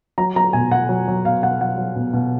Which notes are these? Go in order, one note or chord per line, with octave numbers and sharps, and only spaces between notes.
F#3 A#5
F#3 A#5
B2 G#5
B2 F#5
F#3
F#3
B2 F5
B2 F#5
F#3 F#5
F#3
B2
B2